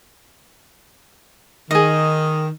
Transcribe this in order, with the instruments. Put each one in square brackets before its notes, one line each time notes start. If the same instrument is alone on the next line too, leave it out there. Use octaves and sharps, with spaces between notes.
[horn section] D#3 [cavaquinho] G#4 D#5